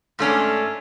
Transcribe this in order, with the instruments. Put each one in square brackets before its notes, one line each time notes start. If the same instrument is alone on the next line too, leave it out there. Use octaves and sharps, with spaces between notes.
[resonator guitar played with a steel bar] G#2 A3 C#4 D4